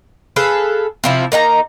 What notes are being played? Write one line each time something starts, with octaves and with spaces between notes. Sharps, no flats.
G#4 A4 B4 F5
C3 F3 E4
A#3 D#4 F5 A#5